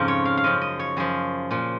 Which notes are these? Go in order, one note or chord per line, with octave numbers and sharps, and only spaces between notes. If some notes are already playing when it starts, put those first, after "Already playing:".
Already playing: F2 G#2 C#3 F3 A#4
C#5
F5
F5
F#2 F3 D#5
D#5
C#5
F#2 F3 G#4
A#2 F3